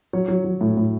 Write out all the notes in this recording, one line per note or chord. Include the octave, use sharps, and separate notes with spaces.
F#3 C#5
F#3
F#3
A2
A2